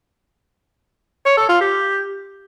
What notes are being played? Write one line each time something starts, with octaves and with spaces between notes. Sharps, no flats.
C#5
A4
F4
G4